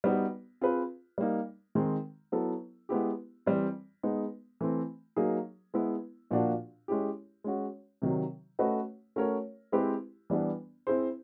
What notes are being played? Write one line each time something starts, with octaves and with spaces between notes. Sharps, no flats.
G3 B3 D#4 F#4
C4 F4 G#4 B4
G3 A#3 D#4
D#3 G#3 C4
F#3 B3 E4 A4
G#3 B3 E4 G4
E3 G3 C4
G#3 B3 D#4
E3 A3 C4
F#3 A#3 D#4 G#4
G#3 B3 E4
A#2 F3 A#3 D4 F#4
G#3 C#4 E4 G4
G#3 C#4 F#4
C3 D#3 F#3
A3 C#4 F#4 B4 D#5
A3 C#4 F#4 A#4 C#5
G#3 C4 E4 G4 B4
E3 G3 B3 D4
C4 E4 G#4 C5